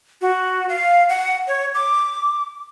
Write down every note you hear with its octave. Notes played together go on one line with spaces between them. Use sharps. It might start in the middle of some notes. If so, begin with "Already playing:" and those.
F#4
F5
F#5
C#5
D6